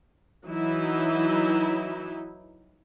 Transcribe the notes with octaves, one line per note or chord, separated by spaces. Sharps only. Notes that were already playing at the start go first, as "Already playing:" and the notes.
E3 F#3 D#4 E4